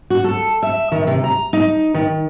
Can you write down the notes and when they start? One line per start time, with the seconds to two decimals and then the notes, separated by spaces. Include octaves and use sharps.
0.10 F#4
0.24 A4
0.63 E5
0.92 D#3
1.07 C3
1.24 A#5
1.53 D#4
1.94 D#3